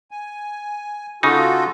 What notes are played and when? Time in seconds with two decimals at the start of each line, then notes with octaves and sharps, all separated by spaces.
0.11 G#5
1.23 C#3 D#4 F4 F#4 A4